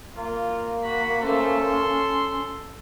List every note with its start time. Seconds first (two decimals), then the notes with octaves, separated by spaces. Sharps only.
0.16 A#3 F4
0.84 F#4 B5
1.22 A3 C#4 A4 C5
1.65 C6